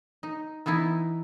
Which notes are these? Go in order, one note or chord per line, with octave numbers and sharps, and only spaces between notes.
D#4
E3 B3 D#4 E4